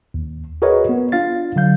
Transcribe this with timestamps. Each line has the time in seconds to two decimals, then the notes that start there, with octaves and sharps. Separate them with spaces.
0.14 D#2
0.62 F#4 G#4 A#4 B4 C#5 D#5
0.89 B3
1.12 D4 F4 F5 A6
1.56 D3 F#3 F5 G6